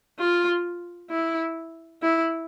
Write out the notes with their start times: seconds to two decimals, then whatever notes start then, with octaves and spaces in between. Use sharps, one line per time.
0.19 F4
1.10 E4
2.02 E4